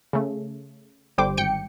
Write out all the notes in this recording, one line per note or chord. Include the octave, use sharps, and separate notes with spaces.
C#3 A3
G1 D3 G3 C5 G5 D6
G#1 G5 C#7